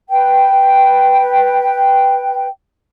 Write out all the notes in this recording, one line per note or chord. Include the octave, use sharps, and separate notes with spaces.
B4 G5